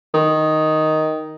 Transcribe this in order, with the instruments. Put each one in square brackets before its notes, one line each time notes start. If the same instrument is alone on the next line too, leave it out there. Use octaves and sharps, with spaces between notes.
[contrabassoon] D#3